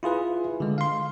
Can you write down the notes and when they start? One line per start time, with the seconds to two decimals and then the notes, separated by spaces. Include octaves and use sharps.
0.03 E4 F4 G#4 B4
0.60 D3 G#3
0.78 F5 C6